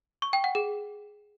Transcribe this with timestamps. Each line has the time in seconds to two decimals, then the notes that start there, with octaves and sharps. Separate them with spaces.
0.22 C#6
0.33 G5
0.44 F#5
0.55 G#4